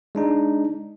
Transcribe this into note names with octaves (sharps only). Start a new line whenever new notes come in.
G#3 D4 D#4